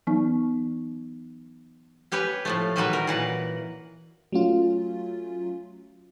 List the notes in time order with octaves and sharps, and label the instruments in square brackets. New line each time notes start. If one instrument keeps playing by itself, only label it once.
[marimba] E3 F#3 B3 C#4 D#4
[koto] C#4 G4 B4 C#5
A2 F3 A3
D#3 E3 F#3 G3 F#4 B4
A#4
A#2 E3 F#5
[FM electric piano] F#3 A3 C#4 F4